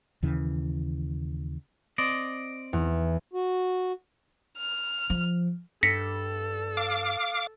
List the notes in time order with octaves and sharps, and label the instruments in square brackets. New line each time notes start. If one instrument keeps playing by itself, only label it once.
[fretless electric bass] D#2 C#3 E3
[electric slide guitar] C4 D5 D#5
[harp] E2
[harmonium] F#4
[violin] F6
[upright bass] F3
[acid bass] G2 [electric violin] A4 [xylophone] A#6 B6 C#7
[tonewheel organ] F5 D6